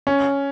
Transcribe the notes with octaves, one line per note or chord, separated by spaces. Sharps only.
C#4